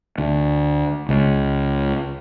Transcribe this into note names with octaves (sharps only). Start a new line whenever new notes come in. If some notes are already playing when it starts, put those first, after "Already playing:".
D2
C#2